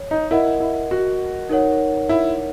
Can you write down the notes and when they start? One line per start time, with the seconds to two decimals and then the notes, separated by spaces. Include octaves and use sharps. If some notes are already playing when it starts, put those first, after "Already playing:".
Already playing: C#5
0.11 D#4
0.31 E4 A#4 D#5 F#5
0.60 E4
0.91 F#4
1.49 D#4 A#4 C#5 F#5
2.09 E4